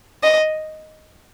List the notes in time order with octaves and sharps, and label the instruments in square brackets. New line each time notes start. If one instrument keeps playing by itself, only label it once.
[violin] D#5